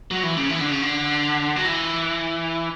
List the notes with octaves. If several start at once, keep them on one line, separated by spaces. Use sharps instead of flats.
F#3
E3
C#3
E3
D3
C#3
D3
F#3
E3